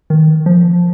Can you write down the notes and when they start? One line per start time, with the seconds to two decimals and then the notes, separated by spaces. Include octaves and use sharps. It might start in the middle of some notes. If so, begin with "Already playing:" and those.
0.10 D#3
0.46 F3